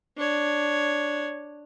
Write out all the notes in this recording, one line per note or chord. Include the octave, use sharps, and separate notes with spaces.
D4 C#5